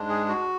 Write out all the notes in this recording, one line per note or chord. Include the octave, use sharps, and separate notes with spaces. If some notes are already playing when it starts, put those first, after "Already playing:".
Already playing: G#2 G#3 D4
G#4
F#4